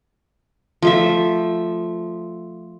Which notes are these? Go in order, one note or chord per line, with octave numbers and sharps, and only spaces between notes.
F3 A3 E5